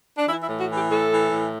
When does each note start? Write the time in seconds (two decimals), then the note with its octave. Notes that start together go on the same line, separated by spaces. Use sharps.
0.18 D4
0.28 E3 E4
0.43 E4
0.49 A2
0.59 F#4
0.69 E3
0.75 G4
0.90 A2 A4
1.11 E3
1.31 A2